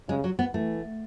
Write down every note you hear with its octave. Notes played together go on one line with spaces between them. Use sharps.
C#3 G#3
F#3
B3
E3 A3